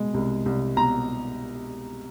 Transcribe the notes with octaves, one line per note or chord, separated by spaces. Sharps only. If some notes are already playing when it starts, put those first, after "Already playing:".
Already playing: B2 G#3
C2
C2
B2 A#5